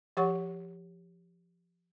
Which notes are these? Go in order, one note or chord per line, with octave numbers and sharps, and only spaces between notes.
F3 G4 C#5 F#5 C#6